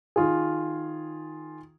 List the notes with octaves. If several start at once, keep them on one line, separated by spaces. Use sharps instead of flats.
D#3 F4 G#4